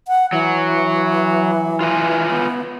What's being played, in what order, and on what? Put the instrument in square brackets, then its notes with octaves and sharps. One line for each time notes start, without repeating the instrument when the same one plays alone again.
[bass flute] F#5
[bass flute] E3 [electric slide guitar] F#3
[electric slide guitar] F4 B4 G#5
[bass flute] B3